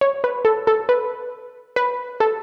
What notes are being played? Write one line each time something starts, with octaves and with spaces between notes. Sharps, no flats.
C#5
B4
A4
A4
B4
B4
A4